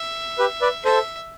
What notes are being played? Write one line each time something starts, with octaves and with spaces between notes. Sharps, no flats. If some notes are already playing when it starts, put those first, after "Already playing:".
Already playing: E5
G4 B4
B4 D5
A4 C5 E5